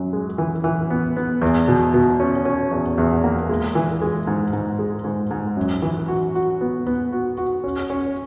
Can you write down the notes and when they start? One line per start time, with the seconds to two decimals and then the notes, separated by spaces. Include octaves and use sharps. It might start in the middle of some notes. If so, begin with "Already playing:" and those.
Already playing: F#2
0.13 G#3
0.38 E3
0.64 E3
0.90 B3
1.16 B3
1.41 E2
1.68 B2
1.94 B2
2.20 C#4
2.45 C#4
2.71 E2
2.98 E2
3.24 A#3
3.49 G#3
3.75 E3
4.01 G#3
4.27 G#2
4.53 G#2
4.79 G#3
5.04 G#2
5.31 G#2
5.57 F#2
5.82 E3
6.08 F#4
6.35 F#4
6.61 B3
6.86 B3
7.12 F#4
7.37 F#4
7.64 C#4
7.90 C#4